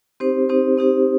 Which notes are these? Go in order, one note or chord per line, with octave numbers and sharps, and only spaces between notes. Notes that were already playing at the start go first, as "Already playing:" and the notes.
C4 D#4 G4 C5
C4 D#4 G4 C5
C4 D#4 G4 C5